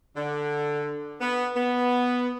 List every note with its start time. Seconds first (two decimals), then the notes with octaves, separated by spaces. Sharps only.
0.16 D3
1.21 B3
1.56 B3